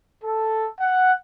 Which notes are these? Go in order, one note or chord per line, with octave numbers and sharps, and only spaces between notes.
A4
F#5